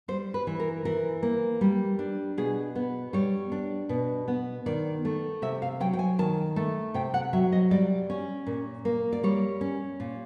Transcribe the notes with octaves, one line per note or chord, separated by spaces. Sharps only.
G3 C5
B4
E3
A#4
E3 A#4
A#3
G3
D4
B2 G#4
B3
G3 C#5
D4
B2
B3
D#3 D5
A3
C3 E5
F5
F#3 G5
G5
G#5
D#3 A5
A3
C3 G5
F#5
F#3 E5
D#5
G3 D5
C#4
A#2
A#3
D5
G3 C#5
C#4
A#2